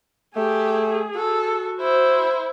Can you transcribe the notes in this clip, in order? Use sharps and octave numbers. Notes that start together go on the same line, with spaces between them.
A3 G4 G#4
F#4 A4
E4 C5